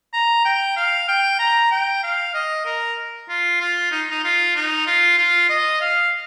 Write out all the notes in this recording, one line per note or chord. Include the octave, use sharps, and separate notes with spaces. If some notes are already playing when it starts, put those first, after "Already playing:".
A#5
G5
F5
G5
A#5
G5
F5
D#5
A#4
F4
F4
D#4
D#4
F4
D#4
F4
F4
D#5
F5